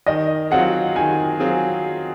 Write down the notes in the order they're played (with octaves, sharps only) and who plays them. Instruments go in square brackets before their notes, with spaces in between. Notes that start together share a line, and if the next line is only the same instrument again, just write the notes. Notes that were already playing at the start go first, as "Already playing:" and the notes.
[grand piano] D#3 [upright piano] D#5
[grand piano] F#3 C4 F4 G#4 [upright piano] F#5
[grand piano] D#3 [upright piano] G#5
[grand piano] F#3 C4 F4 G#4